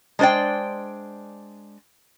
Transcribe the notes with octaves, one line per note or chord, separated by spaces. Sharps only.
G#3 D4 C5 D5 G5